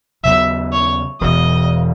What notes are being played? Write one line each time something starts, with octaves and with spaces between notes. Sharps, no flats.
D#2 C#3 F#3 B3 E5
C#5
E1 E2 B2 D#5